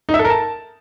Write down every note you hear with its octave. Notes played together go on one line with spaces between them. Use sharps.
D#4
E5
A4
A#4
A5